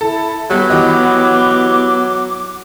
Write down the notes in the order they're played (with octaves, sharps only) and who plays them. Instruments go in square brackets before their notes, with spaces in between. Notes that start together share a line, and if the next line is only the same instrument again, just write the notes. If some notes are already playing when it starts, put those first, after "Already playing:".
[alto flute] E4 [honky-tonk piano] A4
[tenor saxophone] F#3 [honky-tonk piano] G3 [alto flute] B3
[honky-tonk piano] E3 G4 D#5 [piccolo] D6